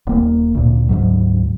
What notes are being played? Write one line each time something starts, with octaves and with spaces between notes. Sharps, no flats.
D#1 A#3
D2 A#2
D2 G#2 F#3